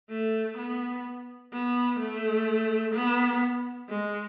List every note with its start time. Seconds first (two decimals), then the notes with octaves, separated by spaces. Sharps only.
0.10 A3
0.58 B3
1.53 B3
2.00 A3
2.95 B3
3.89 G#3